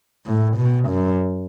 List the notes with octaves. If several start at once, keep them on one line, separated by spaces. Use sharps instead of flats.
A2
B2
F#2